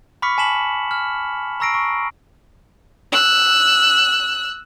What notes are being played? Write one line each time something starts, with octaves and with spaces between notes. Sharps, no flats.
B5 C#6 D6 F6 B6 C#7
G#5 A5 B6 E7 F#7
F6
A#5 C#6 E6 A#6 C7 D7
C#6
E6 F#6